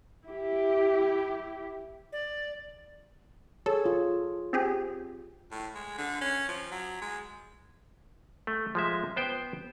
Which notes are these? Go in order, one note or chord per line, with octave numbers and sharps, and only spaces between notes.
E4 G4
D5
G#4 A4 C#5
F4
C4 G4 G#4
A2
G#3
D3
C#4
F3
F#3
G#3
A3
F3 G#3 E5
B3 C5 G5